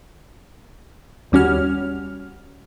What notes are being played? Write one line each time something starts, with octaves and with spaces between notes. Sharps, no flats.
D#2 G3 C#4 F#4 F6